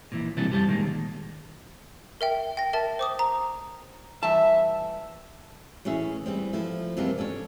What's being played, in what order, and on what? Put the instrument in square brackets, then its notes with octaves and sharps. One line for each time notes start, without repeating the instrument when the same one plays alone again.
[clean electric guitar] A#2 E3
C3 E3 F#3 G3 E4 A4
F#2 G3 C5 A5
A#2 D#3 G#3 A#3
D#2
[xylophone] A#4 E5 G5
G5 A#6
A#4 E5 A5 A6
C5 D6 D#6
A#5
[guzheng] E3 G3 A3 [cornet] E5 [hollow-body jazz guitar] A5
[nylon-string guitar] A2 E3 C#4 G#4 E5
E3 G3 C4
F3 A3 E4
F2 C3 E3 G3 A#3 C4
C#4 D4 A4 C#5